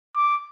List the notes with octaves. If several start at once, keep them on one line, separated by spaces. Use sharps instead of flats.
D6